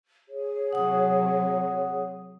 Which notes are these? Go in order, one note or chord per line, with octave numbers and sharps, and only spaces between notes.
G#4 C#5
C3 F#3 F#5 D#6